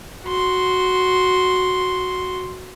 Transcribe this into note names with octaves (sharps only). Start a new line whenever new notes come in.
F#4 C6